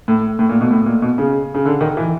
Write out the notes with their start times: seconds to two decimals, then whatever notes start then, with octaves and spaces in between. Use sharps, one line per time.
0.08 A2
0.39 A2
0.49 A#2
0.61 B2
0.71 A2
0.86 A#2
1.02 B2
1.18 C#3
1.55 C#3
1.65 D3
1.81 D#3
1.97 E3